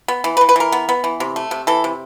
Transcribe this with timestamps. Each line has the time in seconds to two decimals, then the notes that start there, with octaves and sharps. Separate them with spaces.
0.08 B3
0.24 E3
0.37 B4
0.41 E3
0.49 B4
0.56 E3 A#4
0.72 B3
0.89 B3
1.04 E3
1.20 C3
1.36 A3
1.51 C3
1.67 E3 A4
1.84 C3